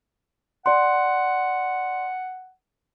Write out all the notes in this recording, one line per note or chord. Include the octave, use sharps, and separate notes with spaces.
D5 F#5 C6